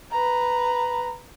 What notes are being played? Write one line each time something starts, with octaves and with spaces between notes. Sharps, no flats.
B4 A#5